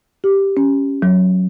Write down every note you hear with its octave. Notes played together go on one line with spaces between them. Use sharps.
G4
C#4
F#3